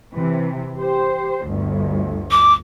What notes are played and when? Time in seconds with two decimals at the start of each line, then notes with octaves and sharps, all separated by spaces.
0.13 C3 E3
0.76 G4 C5
1.44 G1 D2
2.31 D6